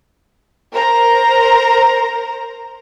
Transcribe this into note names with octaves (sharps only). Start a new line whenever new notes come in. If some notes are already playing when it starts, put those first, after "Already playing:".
A#4 C5 A#5